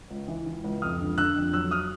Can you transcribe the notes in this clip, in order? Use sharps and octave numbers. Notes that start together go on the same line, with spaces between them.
C#2
E3
E3
C#2
F2 D#6 F6
D3
D3 E6 F#6
F2
F#3 E6 F#6
D#6 F6